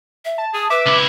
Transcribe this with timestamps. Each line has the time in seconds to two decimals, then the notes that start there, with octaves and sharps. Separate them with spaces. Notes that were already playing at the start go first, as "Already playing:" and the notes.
0.25 E5
0.38 A5
0.54 G#4 D#6
0.70 B4 E5 D6
0.86 C#2 E4